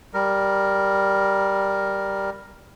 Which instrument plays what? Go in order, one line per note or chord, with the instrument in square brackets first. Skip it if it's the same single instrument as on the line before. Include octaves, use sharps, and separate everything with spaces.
[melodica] G3 A#4